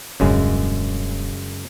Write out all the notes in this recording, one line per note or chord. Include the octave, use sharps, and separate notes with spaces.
D#1 F#2 C#3 G#3 D4